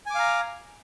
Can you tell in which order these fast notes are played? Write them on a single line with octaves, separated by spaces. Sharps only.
G#5 D6 F5 A#5